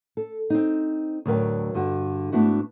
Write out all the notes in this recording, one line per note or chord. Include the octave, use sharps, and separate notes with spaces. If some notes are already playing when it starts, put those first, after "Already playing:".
A4
C4 D#4
D2 A2 F#3 A#4 B4 G5
G2 D3 F#4
G#2 A3 B3 D4 E4 F#4